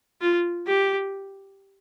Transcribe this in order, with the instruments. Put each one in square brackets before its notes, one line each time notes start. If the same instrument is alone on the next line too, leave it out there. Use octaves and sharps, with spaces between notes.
[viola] F4
G4